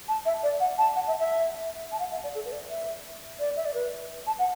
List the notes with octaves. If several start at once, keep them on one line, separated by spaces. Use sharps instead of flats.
A5
E5
D5
F#5
A5
F#5
E5
E5
A5
F#5
E5
D5
A4
B4
D5
E5
D5
E5
D5
B4
A5
F#5